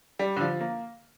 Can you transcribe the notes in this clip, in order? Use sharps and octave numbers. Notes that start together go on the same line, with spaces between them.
G3
D3
F3
A#3